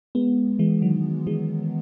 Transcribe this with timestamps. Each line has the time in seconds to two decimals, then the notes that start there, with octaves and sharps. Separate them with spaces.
0.15 G#3 B3
0.59 E3 G#3
0.82 D#3 F#3
1.27 E3 G#3